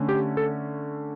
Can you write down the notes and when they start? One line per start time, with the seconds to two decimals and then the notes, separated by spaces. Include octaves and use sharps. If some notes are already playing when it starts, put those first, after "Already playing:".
Already playing: D3 A3 C#4
0.09 G4
0.37 A4